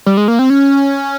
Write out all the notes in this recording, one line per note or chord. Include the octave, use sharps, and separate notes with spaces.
G3
G#3
A#3
C4
C#4